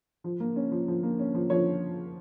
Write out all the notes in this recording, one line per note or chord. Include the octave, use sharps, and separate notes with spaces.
F3
A#3
C#4
F3
F3
A#3
C#4
F3
F3 C#5